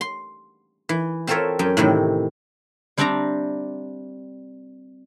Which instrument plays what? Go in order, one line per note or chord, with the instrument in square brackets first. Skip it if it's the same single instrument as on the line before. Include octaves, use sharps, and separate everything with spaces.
[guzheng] C6
E3
C4 F4 A4 A#4 C#5 E5
F#2 C#4 G5
A2 C3 D#3 E3
G3 C4 D4 D5 E5 A#5